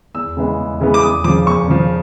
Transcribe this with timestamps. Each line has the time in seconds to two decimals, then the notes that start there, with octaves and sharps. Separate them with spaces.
0.14 E2 E6
0.37 C#3 E3 G#3 B3
0.58 E2
0.81 C#3 E3 G#3 B3
0.94 D6
1.03 E2 D#6
1.24 C#3 F3 D6
1.46 E2 C#6
1.68 C#3 F3